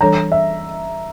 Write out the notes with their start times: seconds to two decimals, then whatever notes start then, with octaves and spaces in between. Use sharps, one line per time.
0.01 E3 G3 D4 A4 C#5 A#5
0.32 E5